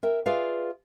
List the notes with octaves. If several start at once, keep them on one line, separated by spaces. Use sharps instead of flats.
A#4 E5 G5
F4 G#4 B4 D5 E5 F5